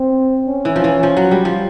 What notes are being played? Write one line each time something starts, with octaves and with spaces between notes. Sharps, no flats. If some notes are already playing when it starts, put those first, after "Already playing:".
Already playing: C4
C#4
E3
F3
E3
F3
F#3
G3
F3